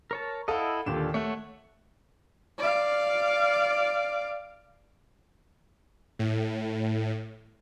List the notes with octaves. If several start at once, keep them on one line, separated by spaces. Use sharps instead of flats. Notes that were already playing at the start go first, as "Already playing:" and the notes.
A#4 C#5 A5
E4 A4 D#5 F5 F#5
D#2 A#2 D3 G4 A4 E7
A3 C#5 F#5 C#6
D5 F5
A2